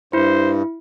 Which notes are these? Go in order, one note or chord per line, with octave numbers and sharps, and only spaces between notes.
G2 E4 C5